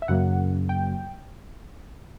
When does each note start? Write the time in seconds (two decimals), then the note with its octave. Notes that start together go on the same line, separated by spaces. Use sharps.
0.02 E5
0.08 F#2 C#3 F#3 A#3 F#5
0.69 G5